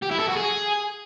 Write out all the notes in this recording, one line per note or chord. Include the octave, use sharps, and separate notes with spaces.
G4
E4
A4
F#4
G#4